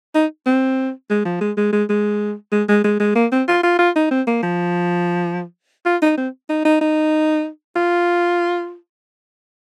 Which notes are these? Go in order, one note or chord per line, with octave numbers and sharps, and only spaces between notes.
D#4
C4
G#3
F3
G#3
G#3
G#3
G#3
G#3
G#3
G#3
G#3
A#3
C4
F4
F4
F4
D#4
C4
A#3
F3
F4
D#4
C4
D#4
D#4
D#4
F4